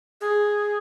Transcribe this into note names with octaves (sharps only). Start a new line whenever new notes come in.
G#4